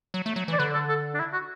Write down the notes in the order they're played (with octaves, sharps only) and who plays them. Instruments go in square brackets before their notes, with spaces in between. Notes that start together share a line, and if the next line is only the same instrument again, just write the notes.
[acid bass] F#3
A3
F#3
E3
[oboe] D5
[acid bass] D3 [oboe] B4
[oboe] A4
A4
D4
E4
F#4